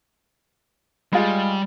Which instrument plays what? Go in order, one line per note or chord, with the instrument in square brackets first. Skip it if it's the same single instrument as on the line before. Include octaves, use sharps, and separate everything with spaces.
[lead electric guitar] G3 [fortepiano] G#3 F4